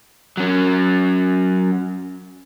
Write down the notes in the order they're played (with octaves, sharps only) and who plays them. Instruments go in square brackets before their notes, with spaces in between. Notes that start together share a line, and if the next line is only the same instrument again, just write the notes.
[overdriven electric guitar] F#3 C#4